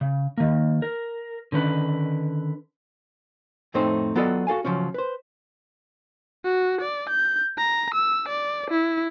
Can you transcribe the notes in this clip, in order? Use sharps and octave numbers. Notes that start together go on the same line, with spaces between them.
C#3
D#3 A#3
A#4
D3 D#3 C#4 B4
F2 A2 A3 C4 D#4 C5
F#3 B3 F4 A4 D5 D#5
F#4 A4 F5 G#5
C#3 F3 F#3 C#4
B4 C5
F#4
D5
G6
A#5
E6
D5
E4